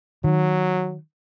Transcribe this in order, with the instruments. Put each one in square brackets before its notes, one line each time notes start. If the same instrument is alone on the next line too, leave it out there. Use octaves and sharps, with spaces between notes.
[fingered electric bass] D#3 [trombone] F#3